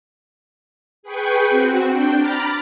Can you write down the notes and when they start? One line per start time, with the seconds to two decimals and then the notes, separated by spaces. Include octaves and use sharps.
1.03 G#4 B4 G5 C#6 G6
1.50 C4 F#4
1.88 D4 G5
2.18 A#5 B5 D6 F6 A6